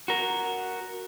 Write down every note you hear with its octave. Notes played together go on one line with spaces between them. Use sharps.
F#4 A#4